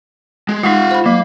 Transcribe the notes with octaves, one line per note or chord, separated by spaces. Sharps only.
G#3
G#3 D#4 F4 F#5
C5 B5
F#3 A#3